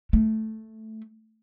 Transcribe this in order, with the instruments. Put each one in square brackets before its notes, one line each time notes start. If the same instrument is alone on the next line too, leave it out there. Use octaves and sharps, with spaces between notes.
[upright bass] A3